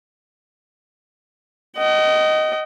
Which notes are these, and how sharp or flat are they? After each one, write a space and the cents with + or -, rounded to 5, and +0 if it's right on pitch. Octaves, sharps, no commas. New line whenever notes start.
D#5 +0 G5 -45